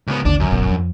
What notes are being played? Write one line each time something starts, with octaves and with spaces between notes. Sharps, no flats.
C#2 B3
A1 D#2 D3 D4
F#2
D1 G1 B2
F2